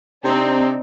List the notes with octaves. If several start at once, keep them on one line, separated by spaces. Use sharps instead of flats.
C3 C4 D4 D#4